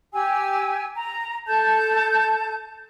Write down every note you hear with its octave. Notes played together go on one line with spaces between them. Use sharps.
G4 G#5 E6
A#5
A4 A5 G6